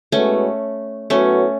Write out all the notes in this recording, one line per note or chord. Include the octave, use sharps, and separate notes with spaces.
A2 G#3 A3 B3 C#4 F#4 B4
A2 F#3 A3 B3 C#4 F#4 B4